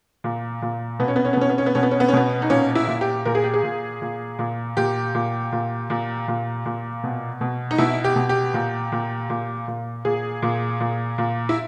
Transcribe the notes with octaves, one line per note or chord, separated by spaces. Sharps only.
A#2
A#2
B2 B3
C#4
B3
C#4
B3
B2 C#4
B3
C#4
B3
B2 C#4
B3
C#4
B3
C#4
B2 B3
D#4
A#2 C#4
E4
A#2
G4
A#2 A#4
G#4
G4
G#4
A#2
A#2
A#2
A#2 G4
A#2
A#2
A#2
A#2
A#2
B2
B2
D#4
B2 E4
G4
B2
G4
A#2
A#2
A#2
A#2
A#2 G#4
A#2
A#2
A#2
E4